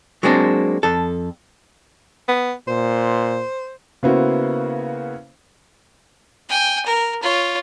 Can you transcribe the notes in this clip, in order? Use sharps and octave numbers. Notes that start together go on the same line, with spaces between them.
F#3 G#3 A#3 C4 D4
F2 A4
B3
A#2 C5
C#3 A#3 B3 E4 F#4 C5
G5 G#5
A#4
F4 C#5